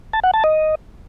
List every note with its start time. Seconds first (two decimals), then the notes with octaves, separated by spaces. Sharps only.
0.13 A5
0.24 F#5
0.34 A5
0.44 D#5